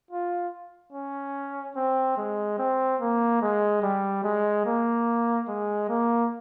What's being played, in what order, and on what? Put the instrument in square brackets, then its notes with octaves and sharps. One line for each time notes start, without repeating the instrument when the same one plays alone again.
[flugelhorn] F4
C#4
C4
G#3
C4
A#3
G#3
G3
G#3
A#3
G#3
A#3